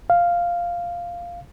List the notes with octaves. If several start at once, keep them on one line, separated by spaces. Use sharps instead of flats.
F5